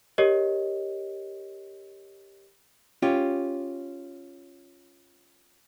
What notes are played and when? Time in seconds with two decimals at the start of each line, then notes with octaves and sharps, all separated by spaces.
0.18 G4 A#4 C#5 D#5
3.02 C#4 F4 G4